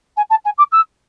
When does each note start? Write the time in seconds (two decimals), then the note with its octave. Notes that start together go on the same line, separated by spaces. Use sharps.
0.16 G#5
0.30 A5
0.45 G#5
0.58 D6
0.72 E6